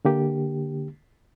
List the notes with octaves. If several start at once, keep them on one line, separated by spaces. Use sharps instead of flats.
D3 A#3 G4